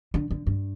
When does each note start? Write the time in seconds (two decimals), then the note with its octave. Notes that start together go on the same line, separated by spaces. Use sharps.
0.14 D3
0.31 D3
0.47 G2